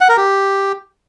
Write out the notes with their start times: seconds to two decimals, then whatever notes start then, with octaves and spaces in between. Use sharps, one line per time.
0.01 F#5
0.09 A#4
0.17 G4